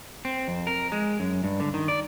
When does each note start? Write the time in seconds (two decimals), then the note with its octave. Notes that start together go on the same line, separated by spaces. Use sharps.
0.25 C4
0.48 F2
0.67 A#4
0.92 G#3
1.20 F#2
1.44 G2
1.60 D3
1.74 D#3
1.88 D5